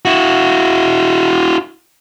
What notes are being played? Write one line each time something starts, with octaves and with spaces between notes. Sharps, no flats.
E4 F#4